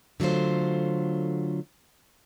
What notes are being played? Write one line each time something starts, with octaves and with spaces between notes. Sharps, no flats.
D3 F#3 A3 F4 C5